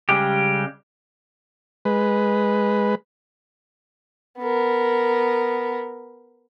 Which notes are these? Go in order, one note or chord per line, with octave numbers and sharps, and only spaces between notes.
C#3 G3 G#3 G4
G#3 B4
B3 A#4